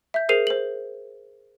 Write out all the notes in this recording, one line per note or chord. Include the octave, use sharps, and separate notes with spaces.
E5 G6
G#4 A#4 C5 C7 D#7 F7
C5 F#7